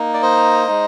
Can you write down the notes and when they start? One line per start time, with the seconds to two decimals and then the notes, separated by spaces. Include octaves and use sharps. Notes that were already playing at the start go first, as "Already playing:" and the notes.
Already playing: A#3 D#4
0.14 D5
0.22 C5 D#5
0.67 G#3 D#4